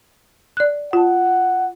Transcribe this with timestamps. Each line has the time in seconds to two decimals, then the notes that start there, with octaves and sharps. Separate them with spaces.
0.57 D5 F#6
0.93 F4 F#5 A5